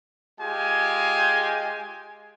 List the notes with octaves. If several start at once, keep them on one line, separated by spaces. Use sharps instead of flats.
G#3 F4 G4 G#5